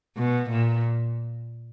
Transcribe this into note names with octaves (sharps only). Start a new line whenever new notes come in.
B2
A#2